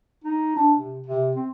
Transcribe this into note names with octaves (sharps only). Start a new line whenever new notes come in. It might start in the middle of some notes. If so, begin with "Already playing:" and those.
D#4
D4
C3
C3
C4